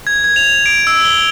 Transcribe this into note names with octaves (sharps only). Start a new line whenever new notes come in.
G#6
G#6
F7
D7
E6
G7